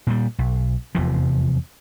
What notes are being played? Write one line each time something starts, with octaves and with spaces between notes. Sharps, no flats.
A#2 G3
B1
F1 E2 C3 F3